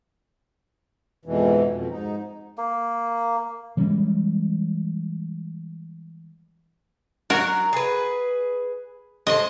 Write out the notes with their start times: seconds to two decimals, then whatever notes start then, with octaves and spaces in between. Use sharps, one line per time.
1.25 F2 G#2 B2 E3
1.70 F2 B2
1.90 G#2 D#4
2.58 A#3
3.77 E3 G3 G#3 C#4
7.30 F#3 F#4 A#4
7.73 G#4 B4
9.27 G#3 A3 C5 D#5